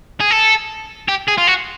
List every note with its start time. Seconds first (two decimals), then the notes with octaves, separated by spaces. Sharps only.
0.20 G#4
0.31 A4
1.08 G4
1.28 G#4
1.38 F4
1.47 F#4